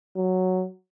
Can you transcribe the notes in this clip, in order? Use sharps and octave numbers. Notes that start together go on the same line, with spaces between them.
F#3